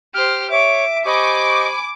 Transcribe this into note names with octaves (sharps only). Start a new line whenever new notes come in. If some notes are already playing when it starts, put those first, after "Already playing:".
G4 C5 F6
C#5 E5 D6
G4 C5 D#5 G#5 B5 C#6 D6